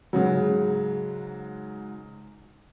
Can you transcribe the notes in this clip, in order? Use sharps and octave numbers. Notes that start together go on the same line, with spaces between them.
G#2 C#3 F#3